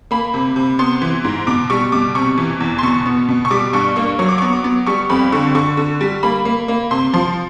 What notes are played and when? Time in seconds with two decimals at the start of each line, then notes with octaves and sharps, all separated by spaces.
0.11 A#3 B5
0.34 C3
0.56 C3
0.79 B3 C6
1.02 E3
1.24 G#2
1.47 B2 D6
1.70 G3 C#6
1.92 B2 D6
2.15 C3 C#6
2.38 E3
2.60 E2
2.79 C6
2.83 B2 C#6
3.06 B3
3.29 B2
3.45 C#6
3.51 G3 D6
3.73 G2 C#6
3.96 A#3 C#6
4.19 F#3 C#6
4.29 D6
4.38 B3 C#6
4.53 D6
4.64 B3
4.87 G3 C#6
5.10 F2 B5
5.32 D3 C#6
5.55 D3 C#6
5.77 D3
6.01 G3
6.23 A#3 B5
6.45 A#3
6.68 A#3
6.91 C3 C6
7.14 F3 C6